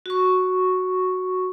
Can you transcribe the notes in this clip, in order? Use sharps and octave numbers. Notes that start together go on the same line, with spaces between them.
F#4 C#6